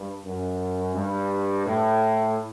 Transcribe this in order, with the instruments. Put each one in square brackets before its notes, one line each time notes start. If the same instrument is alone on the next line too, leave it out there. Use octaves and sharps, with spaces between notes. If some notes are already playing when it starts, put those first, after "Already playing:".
Already playing: [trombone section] G2
F#2
G2
A2